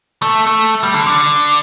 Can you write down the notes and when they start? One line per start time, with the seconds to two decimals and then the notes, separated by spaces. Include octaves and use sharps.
0.22 A3
0.47 A3
0.83 G3
0.94 D3
1.07 D3